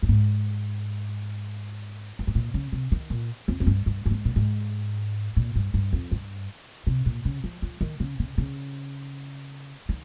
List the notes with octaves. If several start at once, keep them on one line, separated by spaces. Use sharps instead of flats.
G2
G#2
G2
G#2
A#2
C#3
C3
D#3
A#2
F2
F2
G2
G2
G2
G#2
A#2
G#2
A#2
G2
G2
F2
G2
C3
A#2
C#3
F3
F3
D#3
C#3
C#3
C#3
D#3